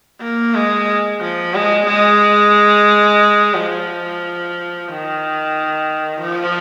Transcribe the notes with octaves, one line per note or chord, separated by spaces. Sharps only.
A#3
G#3
F3
G#3
G#3
F3
D#3
F3